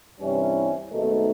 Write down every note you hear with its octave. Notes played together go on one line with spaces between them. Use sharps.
G2 C3 E3 G3 C#4 E4
G#1 B2 A3 D#4